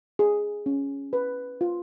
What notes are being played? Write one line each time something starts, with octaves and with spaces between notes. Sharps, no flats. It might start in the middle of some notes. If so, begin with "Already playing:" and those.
G#4
C#4
B4
F4